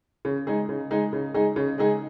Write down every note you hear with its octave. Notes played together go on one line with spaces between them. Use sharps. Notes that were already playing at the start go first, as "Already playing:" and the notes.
C#3
G#3 D#4 G#4
C#3
G#3 D#4 G#4
C#3
G#3 D#4 G#4
C#3
G#3 D#4 G#4